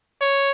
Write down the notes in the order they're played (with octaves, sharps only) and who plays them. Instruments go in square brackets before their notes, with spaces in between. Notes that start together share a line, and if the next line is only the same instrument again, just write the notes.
[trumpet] C#5